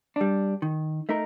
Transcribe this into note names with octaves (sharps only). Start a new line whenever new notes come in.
G3 D4
D#3
A3 D#4 A#4